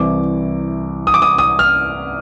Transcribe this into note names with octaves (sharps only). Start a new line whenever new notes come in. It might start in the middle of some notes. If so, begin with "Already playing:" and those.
Already playing: C2 C3 E3 D6
D#6
D6
D#6
D#6
F6